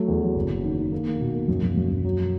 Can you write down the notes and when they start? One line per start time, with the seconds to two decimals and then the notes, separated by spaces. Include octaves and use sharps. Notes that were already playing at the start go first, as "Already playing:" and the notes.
Already playing: F#3 A3
0.08 E2
0.22 F#3
0.36 F#1
0.49 F#1
0.64 D#3
0.78 D#3
0.92 A#3
1.07 A#3
1.21 B2
1.34 A#3
1.48 F#2
1.63 F#2
1.77 F#2
1.90 F#2
2.05 F#3